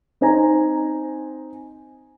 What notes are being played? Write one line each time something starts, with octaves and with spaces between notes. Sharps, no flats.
C4 D#4 C5 G#5 A#5